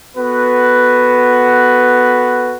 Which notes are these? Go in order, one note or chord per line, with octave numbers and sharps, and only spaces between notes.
B3 F#4 A4 B4